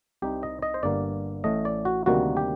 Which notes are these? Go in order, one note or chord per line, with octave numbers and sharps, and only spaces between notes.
C2 C3 G3 C4 D#4 G4
D#5
D#5
C5
G1 G2 D3 G3 A#3 D5
A1 A2 A3 D#5
D5
F#4
D2 C3 D#3 G3 A#3 F#4
G4